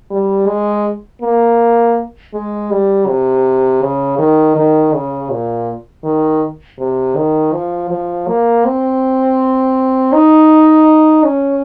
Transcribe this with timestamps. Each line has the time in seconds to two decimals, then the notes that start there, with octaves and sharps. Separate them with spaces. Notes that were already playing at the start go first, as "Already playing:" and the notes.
0.11 G3
0.47 G#3
1.22 A#3
2.33 G#3
2.71 G3
3.07 C3
3.82 C#3
4.18 D#3
4.55 D#3
4.94 C#3
5.31 A#2
6.04 D#3
6.79 C3
7.16 D#3
7.53 F3
7.90 F3
8.28 A#3
8.65 C4
10.13 D#4
11.24 C#4